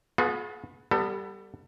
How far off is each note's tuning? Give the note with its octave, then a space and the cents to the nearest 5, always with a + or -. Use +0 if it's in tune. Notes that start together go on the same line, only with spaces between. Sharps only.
B3 +0 F4 +45 G#4 +40
G3 +0 B3 +0 A4 +30